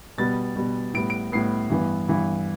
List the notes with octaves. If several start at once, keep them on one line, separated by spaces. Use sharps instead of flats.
B2 G3 B3 A6
B2 G3 B3
A2 G3 B3 D7
D7
A2 G3 B3 C7
G2 E3 B3
G2 E3 B3